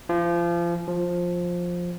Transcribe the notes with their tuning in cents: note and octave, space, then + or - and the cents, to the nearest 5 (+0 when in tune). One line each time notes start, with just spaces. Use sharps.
F3 -30
F3 +10